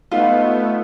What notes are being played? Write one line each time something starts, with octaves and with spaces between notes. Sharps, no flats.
A3 B3 D#4 F4 D#5